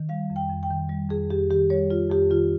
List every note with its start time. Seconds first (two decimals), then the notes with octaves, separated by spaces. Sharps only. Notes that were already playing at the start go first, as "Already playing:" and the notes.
Already playing: D#3
0.09 G3 F5
0.30 F2
0.36 G5
0.50 F2
0.63 G5
0.70 D#3
0.89 G3
1.09 F2 G#4
1.30 F2 G4
1.50 D#3 G4
1.70 G3 C#5
1.90 F2 F4
2.10 F2 G4
2.30 D#3 F4